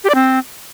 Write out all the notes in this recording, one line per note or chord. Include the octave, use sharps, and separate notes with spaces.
G4
D5
C4